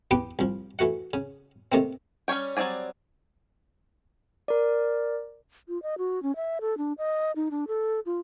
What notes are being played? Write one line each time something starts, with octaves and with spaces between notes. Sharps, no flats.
E2 B3 G4 B4 G5 D6
C2 F3
E3 A3 F#4 F#5
C#3
C3 D#3 A3 A#3 C4
G3 C#4 D4 C#5 G5
F#3 G3 C4 D5 G#5
A#4 D5
F4
D#5
F#4
C#4
E5
A4
D4
D#5
D#4
D4
A4
F4